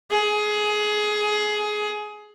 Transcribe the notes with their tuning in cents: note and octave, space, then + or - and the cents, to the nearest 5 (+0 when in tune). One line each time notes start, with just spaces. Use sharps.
G#4 +20